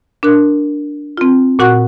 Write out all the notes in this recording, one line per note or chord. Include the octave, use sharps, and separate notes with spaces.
D4 A#4 F#6
C4 F4
A#2 F#4 F#5 C#6 F#6